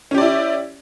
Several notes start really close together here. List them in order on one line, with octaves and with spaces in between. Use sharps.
C#4 G4 D5 E4